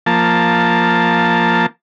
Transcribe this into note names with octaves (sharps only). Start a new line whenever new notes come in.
F3 A#3 A5